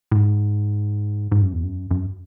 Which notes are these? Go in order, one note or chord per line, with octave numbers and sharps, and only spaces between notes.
A2
G#2
G#2
F#2
E2
F#2
F#2